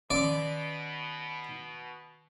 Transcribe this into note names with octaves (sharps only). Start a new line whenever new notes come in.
B2 D#3 C#4 D5